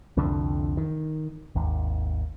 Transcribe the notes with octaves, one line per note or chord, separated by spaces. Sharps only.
C2 F2 D3
D#3
G#1 D#2